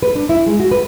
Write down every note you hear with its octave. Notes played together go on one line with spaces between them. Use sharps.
B4
D4
E4
G#3
F#4
B4